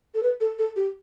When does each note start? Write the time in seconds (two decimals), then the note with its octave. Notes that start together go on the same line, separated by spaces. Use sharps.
0.15 A4
0.23 B4
0.41 A4
0.59 A4
0.76 G4